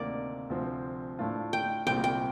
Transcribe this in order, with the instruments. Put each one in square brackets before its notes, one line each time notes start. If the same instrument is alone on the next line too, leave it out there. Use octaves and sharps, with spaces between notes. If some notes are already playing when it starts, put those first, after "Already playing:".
Already playing: [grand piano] D2 C3 D#3 A#3 [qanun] D5
[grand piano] D2 C3 F3 C4
A2 A3 D4 F4
[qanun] G5
[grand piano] C2 A#2 G3 C4 [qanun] G5
[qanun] G5